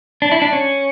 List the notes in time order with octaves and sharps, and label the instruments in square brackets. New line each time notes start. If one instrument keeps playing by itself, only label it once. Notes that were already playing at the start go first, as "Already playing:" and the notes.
[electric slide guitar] D4
E4
D4
C#4